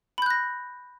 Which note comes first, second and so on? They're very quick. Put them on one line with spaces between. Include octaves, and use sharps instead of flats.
B5 G6 F#6 A#6